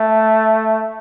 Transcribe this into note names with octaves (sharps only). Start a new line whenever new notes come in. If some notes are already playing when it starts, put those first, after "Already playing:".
Already playing: A3